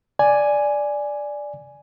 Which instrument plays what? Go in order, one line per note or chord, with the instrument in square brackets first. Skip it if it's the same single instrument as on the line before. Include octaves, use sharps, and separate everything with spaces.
[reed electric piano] D5 G#5